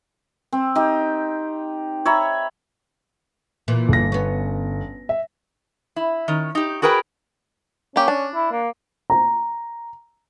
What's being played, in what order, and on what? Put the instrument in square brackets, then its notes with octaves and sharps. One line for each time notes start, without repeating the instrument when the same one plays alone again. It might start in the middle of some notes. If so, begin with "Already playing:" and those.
[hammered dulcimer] C4
D#4 G4
C#5 E5 A#5 B5
[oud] A#2 E3
[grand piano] G1 A#6
[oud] B3 C#4
[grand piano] E5
[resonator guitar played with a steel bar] E4
D#3 C#4
D#4 G4
F#4 G#4 A#4 B4 G5
[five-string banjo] A#3 G4 [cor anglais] C#4
[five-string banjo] D4
[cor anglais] E4
A#3
[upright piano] A#5